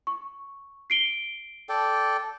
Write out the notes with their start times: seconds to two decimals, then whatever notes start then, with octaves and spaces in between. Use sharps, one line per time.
0.07 C#6
0.90 C7 D7 G7
1.69 A4 D5 G5